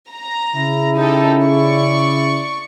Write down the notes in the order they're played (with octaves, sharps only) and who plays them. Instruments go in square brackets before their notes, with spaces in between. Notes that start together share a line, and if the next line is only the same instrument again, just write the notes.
[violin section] A#5
[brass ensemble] C#3 E4
[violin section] D#4 G4 A4
D5 C#6